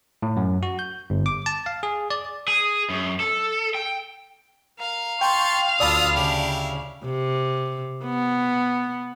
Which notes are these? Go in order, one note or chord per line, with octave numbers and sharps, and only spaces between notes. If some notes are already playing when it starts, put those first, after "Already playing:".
A2
F#2
F#4
G6
G1
D6
A5
F5
G#4
D5
G#4
F#2
A4
G5
A#4 F5
G5 A5 C6 C#6
D2 F4 D5 A5 B5 D#6 E6
C#3 E4 G4
C3
B3